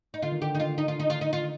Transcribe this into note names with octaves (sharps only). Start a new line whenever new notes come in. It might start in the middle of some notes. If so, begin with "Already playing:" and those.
D#4
D3 F4
D#3
D3 G4
D#4
F4
D#4
F4
D#4
F4
D#4
F4